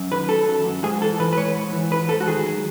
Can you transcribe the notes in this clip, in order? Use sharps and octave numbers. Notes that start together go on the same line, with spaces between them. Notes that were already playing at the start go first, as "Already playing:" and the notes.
Already playing: F#2
D#3 B4
F#3 A4
F#2
F#2
G#2 G#4
E3 A4
E3 B4
B4
G#2 C#5
G#2
E3
G#2 B4
G#2 A4
F#4
D#3 G#4
F#3